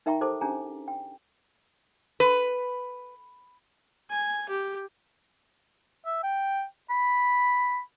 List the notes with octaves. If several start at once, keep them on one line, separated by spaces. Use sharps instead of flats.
D#4 A#4 E5 G5 A#5 C#6
G4 A4 A#4 C5 A5 D6
C#4 D4 G4 G#4 G#5 A#5
G5
B4
G#5
G4
E5
G5
B5